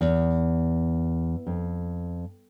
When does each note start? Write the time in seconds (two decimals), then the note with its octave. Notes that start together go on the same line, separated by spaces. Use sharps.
0.01 E2
1.47 F2